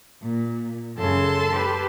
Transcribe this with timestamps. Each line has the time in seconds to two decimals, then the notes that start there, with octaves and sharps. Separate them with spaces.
0.22 A#2
0.97 F#2 C#3 A4 A5 C6
1.52 G4 B4